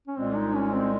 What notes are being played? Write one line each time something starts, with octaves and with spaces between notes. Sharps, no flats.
C#4
C2 A#2 G#3 C4
D#4
C#4
C4